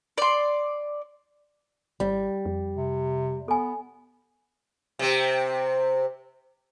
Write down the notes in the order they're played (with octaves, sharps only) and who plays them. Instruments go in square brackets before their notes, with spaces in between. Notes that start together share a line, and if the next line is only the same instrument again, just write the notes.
[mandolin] D5 C6
[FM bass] G#1 [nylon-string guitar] G3
[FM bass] F2
[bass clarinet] C3
[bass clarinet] B3 [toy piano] A4 G#5
[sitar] C3 C4